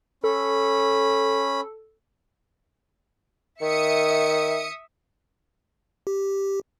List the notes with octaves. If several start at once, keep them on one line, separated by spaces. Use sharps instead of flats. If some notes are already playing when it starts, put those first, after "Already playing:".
C#4 A4 B5
D#3 E5 D#6 C#7
G4